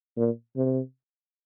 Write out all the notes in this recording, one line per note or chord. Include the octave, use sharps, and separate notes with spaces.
A#2
C3